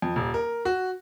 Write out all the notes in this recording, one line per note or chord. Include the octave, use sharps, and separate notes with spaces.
F2
D#1
A#4
F#4